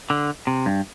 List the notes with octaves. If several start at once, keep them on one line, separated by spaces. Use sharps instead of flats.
D3
C3
G2